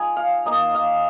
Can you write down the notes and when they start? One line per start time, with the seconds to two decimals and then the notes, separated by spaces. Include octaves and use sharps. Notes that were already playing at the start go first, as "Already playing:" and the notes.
Already playing: F3 G#3 D#4 G#5 A#5
0.17 F5
0.45 A#3 D#4 D#5
0.75 F5